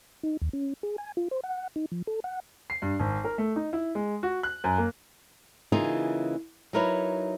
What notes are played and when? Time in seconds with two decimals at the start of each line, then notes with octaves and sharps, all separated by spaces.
0.23 D#4
0.42 D#2
0.53 C#4
0.83 G#4
0.98 G#5
1.17 F4
1.31 C5
1.43 F#5
1.76 D#4
1.92 F3
2.07 A4
2.24 F#5
2.70 C7
2.82 G2
3.00 G#1
3.24 A#4
3.38 A3
3.56 D#4
3.73 E4
3.95 G#3
4.23 F#4
4.43 F#6
4.64 F#2
4.78 A#3
5.72 C#3 E3 A#3 D#4 F4 G#4
6.73 F#3 D#4 E4 A#4 B4 C#5